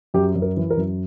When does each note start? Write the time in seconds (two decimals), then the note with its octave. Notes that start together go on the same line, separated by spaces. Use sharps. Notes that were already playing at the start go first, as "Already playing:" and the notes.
0.14 F#2 G4
0.35 F#2
0.42 A#4
0.57 E3
0.70 A#4
0.77 F#2